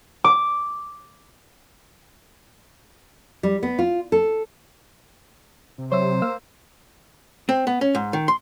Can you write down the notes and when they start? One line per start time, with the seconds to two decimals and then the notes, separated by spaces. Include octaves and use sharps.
0.24 D6
3.43 G3
3.63 B3
3.79 F4
4.12 A4
5.78 C3
5.92 F#3 C5 C#5 E5
6.22 A#3 F5 E6
7.49 C4
7.67 B3
7.81 C#4
7.95 G#2
8.13 D#3
8.28 C6